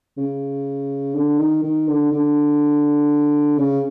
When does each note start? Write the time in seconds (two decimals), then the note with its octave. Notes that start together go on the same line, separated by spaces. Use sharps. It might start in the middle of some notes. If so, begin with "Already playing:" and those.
0.17 C#3
1.15 D3
1.38 D#3
1.63 D#3
1.88 D3
2.12 D3
3.58 C#3